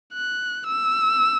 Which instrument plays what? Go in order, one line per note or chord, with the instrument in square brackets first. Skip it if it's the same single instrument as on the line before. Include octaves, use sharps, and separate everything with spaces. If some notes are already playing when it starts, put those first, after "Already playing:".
[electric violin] F#6
E6